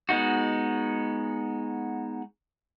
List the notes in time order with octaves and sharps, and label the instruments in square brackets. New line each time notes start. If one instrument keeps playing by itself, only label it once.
[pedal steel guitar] G#3 B3 D#4 F#4